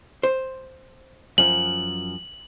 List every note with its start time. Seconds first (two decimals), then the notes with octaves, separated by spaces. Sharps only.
0.23 C5
1.38 F#2 F3 F#7